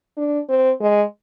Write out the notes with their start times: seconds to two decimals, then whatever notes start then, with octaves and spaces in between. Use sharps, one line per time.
0.17 D4
0.49 C4
0.81 G#3